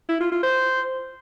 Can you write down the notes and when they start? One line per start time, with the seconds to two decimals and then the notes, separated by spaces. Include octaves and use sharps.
0.09 E4
0.20 F4
0.31 F4
0.43 C5